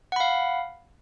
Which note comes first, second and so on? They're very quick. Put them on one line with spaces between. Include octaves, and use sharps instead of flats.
F#5 B5 F5